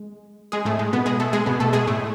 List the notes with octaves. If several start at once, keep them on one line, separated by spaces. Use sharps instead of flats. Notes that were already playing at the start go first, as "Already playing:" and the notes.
Already playing: G#3
G#3 G#4
A2 A3
G#3
B2 B3
G#3 G#4
A3 A4
G#3 G#4
B2 B3
A3 A4
G#3 G#4
A2 A3